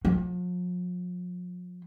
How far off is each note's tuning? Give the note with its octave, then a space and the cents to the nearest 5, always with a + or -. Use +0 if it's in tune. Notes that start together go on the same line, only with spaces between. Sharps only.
F3 +45